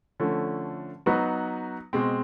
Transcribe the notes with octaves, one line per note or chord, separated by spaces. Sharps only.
D3 F3 A3 C#4
F#3 B3 D#4 F#4 B4
B2 G#3 C4